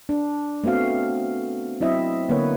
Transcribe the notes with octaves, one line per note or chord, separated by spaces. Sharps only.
D4
A3 B3 C4 F#4 F5
F#3 C4 E4 D#5 E5
D3 A#3 B3 B4 C#5